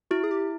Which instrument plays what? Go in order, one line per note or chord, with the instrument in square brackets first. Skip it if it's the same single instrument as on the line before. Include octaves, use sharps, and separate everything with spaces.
[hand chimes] E4 [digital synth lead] F#4
[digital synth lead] G#4
G4